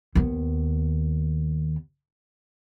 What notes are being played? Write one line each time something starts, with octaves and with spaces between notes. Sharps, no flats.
D#2 B3